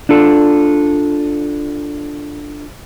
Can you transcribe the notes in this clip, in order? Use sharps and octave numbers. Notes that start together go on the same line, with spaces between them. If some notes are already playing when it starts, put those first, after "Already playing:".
D4 F4 A4